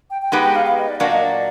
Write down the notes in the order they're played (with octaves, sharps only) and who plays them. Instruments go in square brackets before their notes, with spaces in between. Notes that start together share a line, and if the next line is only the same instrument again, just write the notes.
[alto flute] G5
G5
[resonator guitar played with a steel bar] G#3 B3 D#4 G4 B4 [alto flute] F#5
[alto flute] G5
F5
F5
D#5
D5
[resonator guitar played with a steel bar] A#2 F#3 A#3 D4 F#4 [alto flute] D5
[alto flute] D#5
D5